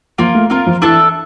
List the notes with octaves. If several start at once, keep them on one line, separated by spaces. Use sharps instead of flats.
F3 A#3 F4 A#4
A3
A#3 C4 F4 A#4
F3
E3 D4 A4 E5 A5